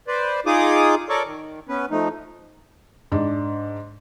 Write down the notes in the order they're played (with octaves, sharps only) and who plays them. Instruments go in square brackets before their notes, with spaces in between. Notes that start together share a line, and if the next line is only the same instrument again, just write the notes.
[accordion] B4 C5 D5
D#4 F4 G#4 D6 D#6
A4 A#4 C#5 D5 C#6 D6
D#3
B3 C#4 B4
F3 A3 D#4
[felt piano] G#2 D4